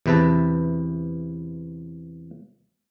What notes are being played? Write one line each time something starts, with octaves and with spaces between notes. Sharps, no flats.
E2 C3 B4 E5 A5